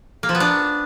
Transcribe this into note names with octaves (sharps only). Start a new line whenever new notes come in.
A#3
F3
B3
D4